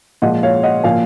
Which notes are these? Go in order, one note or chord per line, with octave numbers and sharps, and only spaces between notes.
A#2 F3 G#3 D#5 F#5
C#5 F5
D#5 F#5
A#2 F3 A#3 F5 G#5